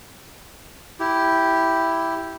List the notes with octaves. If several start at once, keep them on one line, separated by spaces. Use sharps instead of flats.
E4 G4